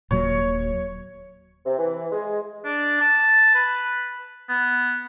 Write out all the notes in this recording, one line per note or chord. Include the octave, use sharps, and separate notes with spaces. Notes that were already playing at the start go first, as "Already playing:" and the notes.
D#1 A#2 F#3 C#5
C3
E3
G#3
D4
A5
B4
B3